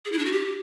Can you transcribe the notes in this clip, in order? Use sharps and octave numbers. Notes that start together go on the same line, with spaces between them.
G#4
E4
D4
F#4
G4